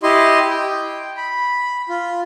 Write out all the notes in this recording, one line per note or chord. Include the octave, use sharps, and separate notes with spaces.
E4 G4 D#5 C6
G5
B5
F4